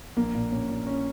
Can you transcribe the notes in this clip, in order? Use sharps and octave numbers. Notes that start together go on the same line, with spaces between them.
A#1 A#3
A#2
A#2 C#4
A#1
C#4